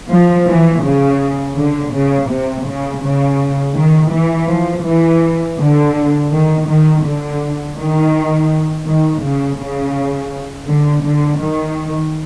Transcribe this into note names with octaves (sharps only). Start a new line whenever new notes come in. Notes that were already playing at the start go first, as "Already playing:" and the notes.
F3
E3
C#3
D3
C#3
C3
C#3
C#3
D#3
E3
F3
E3
D3
D#3
D#3
D3
D#3
D#3
C#3
C#3
D3
D3
D#3